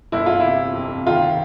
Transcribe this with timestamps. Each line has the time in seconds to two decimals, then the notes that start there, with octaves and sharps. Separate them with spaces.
0.12 G1 E4
0.26 F4
0.40 C3 E4
0.75 F2
1.07 D#3 F4